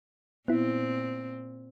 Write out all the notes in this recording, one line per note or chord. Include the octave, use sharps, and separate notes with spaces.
A#2 B3 C4 E4